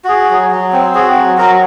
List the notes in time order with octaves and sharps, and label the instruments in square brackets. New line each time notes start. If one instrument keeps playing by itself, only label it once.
[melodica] F#4 G#4
F#3
F#3
C4
F#4 G#4
F#3
F#3 F#4 A#4